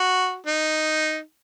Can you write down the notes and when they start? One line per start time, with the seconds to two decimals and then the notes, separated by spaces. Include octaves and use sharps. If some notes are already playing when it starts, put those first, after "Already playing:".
Already playing: F#4
0.46 D#4